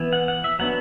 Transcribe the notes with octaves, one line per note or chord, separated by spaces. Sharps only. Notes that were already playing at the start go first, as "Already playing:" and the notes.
Already playing: E3 B3 E4
F#5
F#5
E5
F#3 B3 D4 F#5